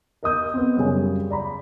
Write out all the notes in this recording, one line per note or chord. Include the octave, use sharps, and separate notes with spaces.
A#4 D#5 D#6 G6
B3 C4
F#2 C#3 G3 G#4 C#5 G#5
D5 A#5 B5